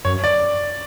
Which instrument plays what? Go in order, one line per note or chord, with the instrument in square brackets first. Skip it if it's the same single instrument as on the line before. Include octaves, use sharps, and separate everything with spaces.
[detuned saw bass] F#2 [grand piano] C#5
[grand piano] D5